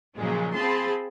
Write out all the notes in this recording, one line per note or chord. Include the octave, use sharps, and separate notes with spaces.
A#2 C#3 F3 F#3 G#3 A#3
C4 F4 G#4 A5 B5 C6